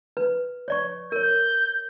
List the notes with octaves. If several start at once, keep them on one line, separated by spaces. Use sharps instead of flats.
B4
C#5 D5 C#6
A#4 C#5 G6